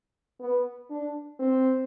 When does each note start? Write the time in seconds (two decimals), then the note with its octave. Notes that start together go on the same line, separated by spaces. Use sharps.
0.41 B3
0.91 D4
1.40 C4